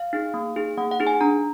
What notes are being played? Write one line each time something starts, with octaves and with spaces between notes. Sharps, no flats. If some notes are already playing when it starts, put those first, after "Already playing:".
Already playing: F5
D#4 G#4
A#3
D#4 G#4
A#3 F#5
F#5
D#4 G#4
G#5
D4 A#5